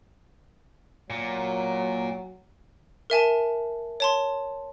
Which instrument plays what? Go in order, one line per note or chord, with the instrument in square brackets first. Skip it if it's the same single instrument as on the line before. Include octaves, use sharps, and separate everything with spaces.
[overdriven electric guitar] A#2 [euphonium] F#3
[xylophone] A#4 E5 G#5 A5
C#5 A5 C6